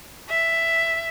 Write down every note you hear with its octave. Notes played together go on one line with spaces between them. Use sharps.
E5